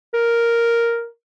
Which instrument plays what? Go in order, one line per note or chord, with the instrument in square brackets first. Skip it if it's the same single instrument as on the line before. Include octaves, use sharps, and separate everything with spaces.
[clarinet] A#4